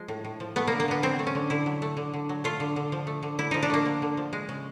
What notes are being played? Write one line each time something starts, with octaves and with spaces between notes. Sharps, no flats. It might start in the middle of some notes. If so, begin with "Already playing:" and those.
Already playing: F3 G#3
A2
A2
F3
A3 B3
D3 A#3
A#3
D3 B3
F#3 C4
A3
C#4
D3
D3 E4
F#3
A3
D3
D3
F#3
A3 F4
D3
D3
F3
A3
D3
D3 E4
F3 D#4
D4
A3 A#3
D3
D3
F3
G#3
C#3